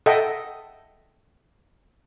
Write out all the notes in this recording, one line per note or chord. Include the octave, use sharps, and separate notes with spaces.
A4 D#5 E5 F#5 G5